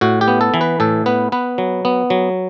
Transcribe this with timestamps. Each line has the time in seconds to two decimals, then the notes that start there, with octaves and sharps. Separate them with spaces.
0.01 A2 F#4
0.21 G4
0.28 B3
0.41 A4
0.54 E3
0.61 B4
0.80 A2 A4
1.06 B3 B4
1.32 B3 B4
1.58 F#3
1.85 B3
2.10 F#3